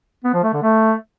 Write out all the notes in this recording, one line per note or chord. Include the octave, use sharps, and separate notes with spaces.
B3
F3
A3
D3
A3